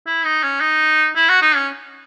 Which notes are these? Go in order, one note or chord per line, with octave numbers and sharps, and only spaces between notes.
E4
D#4
C#4
D#4
E4
F#4
D#4
C#4